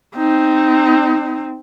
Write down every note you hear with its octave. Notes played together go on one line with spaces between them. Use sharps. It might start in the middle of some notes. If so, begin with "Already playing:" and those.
C4 D#4